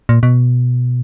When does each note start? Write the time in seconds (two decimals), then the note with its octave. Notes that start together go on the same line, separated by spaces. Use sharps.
0.09 A#2
0.23 B2